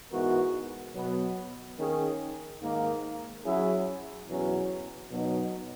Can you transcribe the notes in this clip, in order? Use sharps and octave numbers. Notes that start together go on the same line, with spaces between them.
G#2 E3 B3 F#4 A#4
B2 F#3 B3
D#3 A#3 C#4 G#4
G#2 D#3 A#3 D#4 A#4
F#3 C#4 E4 G#4
E2 B2 F#3 C#4
B2 F#3 B3 D#4